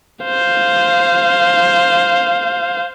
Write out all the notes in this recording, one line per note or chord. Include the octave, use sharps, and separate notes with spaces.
C5 F5